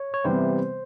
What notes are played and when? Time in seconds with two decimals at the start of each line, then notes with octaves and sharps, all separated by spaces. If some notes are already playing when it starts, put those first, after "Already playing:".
Already playing: C#5
0.14 C#5
0.24 C3 E3 G3 B3 C5